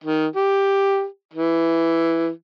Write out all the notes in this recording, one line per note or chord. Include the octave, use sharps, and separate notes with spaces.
D#3
G4
E3